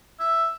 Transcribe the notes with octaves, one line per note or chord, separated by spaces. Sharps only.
E5